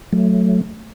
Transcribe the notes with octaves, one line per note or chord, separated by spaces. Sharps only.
F#3 A3